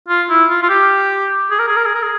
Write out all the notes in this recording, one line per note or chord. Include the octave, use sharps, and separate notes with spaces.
F4
E4
F4
F4
G4
G#4
A#4
G#4
A#4
G#4
A#4
G#4